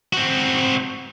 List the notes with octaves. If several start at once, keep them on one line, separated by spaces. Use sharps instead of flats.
C4 F#4